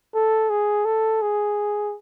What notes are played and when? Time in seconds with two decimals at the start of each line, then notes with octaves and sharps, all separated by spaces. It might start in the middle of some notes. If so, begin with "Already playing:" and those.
0.14 A4
0.50 G#4
0.85 A4
1.22 G#4